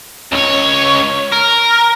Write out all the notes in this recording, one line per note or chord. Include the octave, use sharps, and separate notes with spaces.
C#2 C#5
A#4